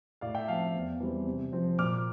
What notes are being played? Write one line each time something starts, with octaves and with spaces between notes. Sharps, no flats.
A2 D5 F5
E5 G5
F3 C4 F5 A5
E2
E3 G3 C4
C3
F3 C4
A#2 D6 F6